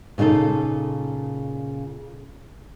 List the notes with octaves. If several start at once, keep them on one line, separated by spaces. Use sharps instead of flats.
A#2 C#3 D#4 F4 A4